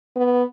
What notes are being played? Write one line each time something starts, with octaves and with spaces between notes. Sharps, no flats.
B3